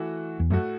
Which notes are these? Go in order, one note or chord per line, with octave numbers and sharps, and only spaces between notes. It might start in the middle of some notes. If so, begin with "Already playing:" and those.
Already playing: E3 A3 F#4
E2
F#2 A2 A3 F#4